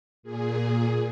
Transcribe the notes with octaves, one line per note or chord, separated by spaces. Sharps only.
A#2 G#4